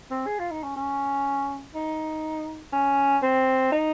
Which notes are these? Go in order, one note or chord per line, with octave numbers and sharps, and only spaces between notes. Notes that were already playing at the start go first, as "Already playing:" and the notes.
C4
G#4
F4
D#4
C#4
C#4
D#4
C#4
C4
D#4